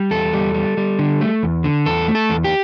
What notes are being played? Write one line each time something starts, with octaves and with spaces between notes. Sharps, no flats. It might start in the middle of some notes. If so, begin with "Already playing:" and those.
Already playing: G3
E2 A4
G3
G3
G3
D3
A3
E2
D3
E2 A4
A3
A4
E2
G4